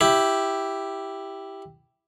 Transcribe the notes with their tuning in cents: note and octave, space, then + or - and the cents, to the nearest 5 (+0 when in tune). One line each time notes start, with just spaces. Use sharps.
E4 +0 G4 +0